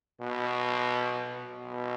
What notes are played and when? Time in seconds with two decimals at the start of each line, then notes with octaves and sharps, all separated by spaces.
0.20 B2
1.38 B2